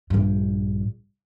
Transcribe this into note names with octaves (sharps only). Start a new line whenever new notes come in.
A#1 G2